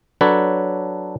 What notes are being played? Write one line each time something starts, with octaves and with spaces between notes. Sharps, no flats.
F#3 D4 A4 B4 C#5